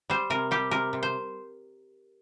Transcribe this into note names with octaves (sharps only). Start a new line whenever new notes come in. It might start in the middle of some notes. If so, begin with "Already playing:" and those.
G3 C5
C3 A#4
G3 G4
C3 A#4
C3
C5